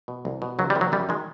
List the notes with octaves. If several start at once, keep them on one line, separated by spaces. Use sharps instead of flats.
B2
C2
B2
C#2 F#3
G3
C3 D#3
F#3
F#2 G3
D#3 G#3